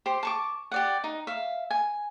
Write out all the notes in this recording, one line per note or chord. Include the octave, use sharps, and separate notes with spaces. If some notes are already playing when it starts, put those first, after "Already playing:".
G4 C5
A5 C#6 D6
G4 D5 F#5
D#4
E5 F5
G#5